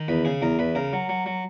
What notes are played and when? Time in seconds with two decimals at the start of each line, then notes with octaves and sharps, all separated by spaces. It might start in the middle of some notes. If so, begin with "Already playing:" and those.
Already playing: D#3
0.08 E2 B4
0.25 C#3 G#4
0.42 E2 A#4
0.59 E2 B4
0.75 C#3 A#4
0.93 F#3
1.09 F#3
1.26 F#3